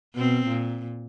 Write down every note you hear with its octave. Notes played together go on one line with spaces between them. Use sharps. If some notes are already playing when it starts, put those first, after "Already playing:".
B2 C4
A#2